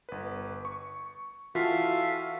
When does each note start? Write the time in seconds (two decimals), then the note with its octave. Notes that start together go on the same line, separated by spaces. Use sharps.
0.09 G1 B4
0.65 C#6
1.55 E3 F4 F#4 A4 E5 F5